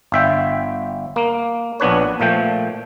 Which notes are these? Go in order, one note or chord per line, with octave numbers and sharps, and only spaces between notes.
G1 E5 G5
A#3
A#1 B3 D4 B4 C#5
A#2 F3 A3 G5